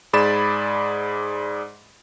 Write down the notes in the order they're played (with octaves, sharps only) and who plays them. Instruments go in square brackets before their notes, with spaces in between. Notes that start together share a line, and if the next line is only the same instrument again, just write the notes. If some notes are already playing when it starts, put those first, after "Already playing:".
[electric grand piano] G#2 G#4 D5 B5 A6 E7